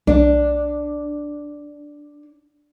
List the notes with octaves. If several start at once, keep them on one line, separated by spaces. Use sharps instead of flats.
B1 D4